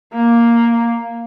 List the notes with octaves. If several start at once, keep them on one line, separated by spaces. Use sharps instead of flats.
A#3